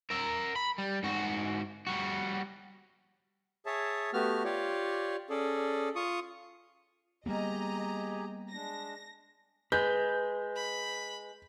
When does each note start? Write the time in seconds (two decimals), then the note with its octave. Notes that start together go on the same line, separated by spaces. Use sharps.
0.10 A#4 E5
0.56 B5
0.78 G3
1.03 G#2 F#4
1.87 G3 F#4
3.66 G#4 C#5 E5 A5
4.13 A3 B3 F#4 G4 F6
4.44 F4 G4 C#5 D5
5.30 C#4 G#4 A4 D5
5.96 F4 C#6 D#6
7.26 G3 A#3 B3 G4 G#4 D#5 A#5
8.52 G#3 D4 A#6
9.72 G#3 B4 G6
10.56 B5